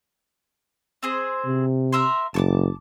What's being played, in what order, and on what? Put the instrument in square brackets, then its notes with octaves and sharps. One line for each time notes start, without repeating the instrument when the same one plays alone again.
[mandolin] C4 G#4 C5
[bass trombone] C3
[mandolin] A#4 E5 C6
[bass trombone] F#1 [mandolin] A5 C#6 D6